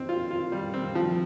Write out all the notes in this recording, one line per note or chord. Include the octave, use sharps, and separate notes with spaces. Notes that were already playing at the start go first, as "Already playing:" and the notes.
Already playing: C4
F4
F4
G3
C4
F3